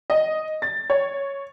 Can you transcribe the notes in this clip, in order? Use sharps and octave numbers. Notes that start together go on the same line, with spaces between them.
D#5
A6
C#5